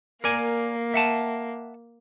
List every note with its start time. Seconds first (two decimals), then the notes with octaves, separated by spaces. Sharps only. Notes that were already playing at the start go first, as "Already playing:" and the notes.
0.24 A#3 A#4 D5 G#5
0.94 E5 F#5 A5